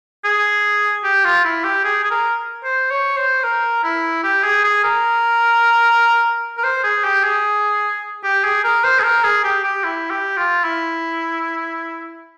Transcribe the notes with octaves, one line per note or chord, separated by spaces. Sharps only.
G#4
G4
F4
E4
G4
G#4
G#4
A#4
C5
C#5
C5
A#4
E4
G4
G#4
G#4
A#4
A#4
C5
G#4
G4
G#4
G4
G#4
A#4
C5
G#4
A#4
G#4
G4
G4
E4
G4
F4
E4